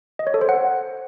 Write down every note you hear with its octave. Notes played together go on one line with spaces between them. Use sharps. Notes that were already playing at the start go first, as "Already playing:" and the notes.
D#5
C#5
A4
C5
F#5